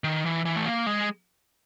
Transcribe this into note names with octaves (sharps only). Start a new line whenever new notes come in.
D#3
E3
E3
A3
A#3
G#3